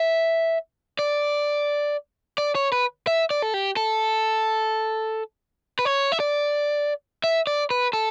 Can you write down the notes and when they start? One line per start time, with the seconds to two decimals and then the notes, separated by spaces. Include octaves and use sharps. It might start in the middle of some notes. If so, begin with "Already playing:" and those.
Already playing: E5
0.99 D5
2.38 D5
2.55 C#5
2.72 B4
3.07 E5
3.30 D5
3.42 A4
3.54 G4
3.77 A4
5.79 B4
5.85 C#5
6.12 E5
6.20 D5
7.24 E5
7.47 D5
7.70 B4
7.93 A4